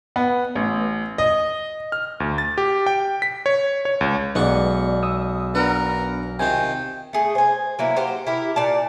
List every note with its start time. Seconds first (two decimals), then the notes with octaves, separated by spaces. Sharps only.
0.16 B3
0.55 A1
1.18 D#5
1.92 F6
2.20 D2
2.38 A6
2.58 G4
2.87 G5
3.22 B6
3.46 C#5
3.85 C#5
4.01 C#2
4.35 B1 G#3 B3 D5 F#5 C#6
5.03 D#6 E6
5.55 B3 D4 A#4 B4 F#5
6.39 C3 D#3 F4 G5 G#5
7.13 A3 G#4
7.35 C5 G#5
7.79 F#3 A#3 E4
7.97 F#4 G4 C5
8.27 E4 G4 A#4
8.56 A#2 D5 A5